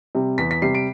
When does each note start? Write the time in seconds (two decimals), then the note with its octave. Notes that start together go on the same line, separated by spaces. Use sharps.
0.15 C3 G3
0.38 E2 B6
0.51 B6
0.62 C3 G3 C7
0.75 D7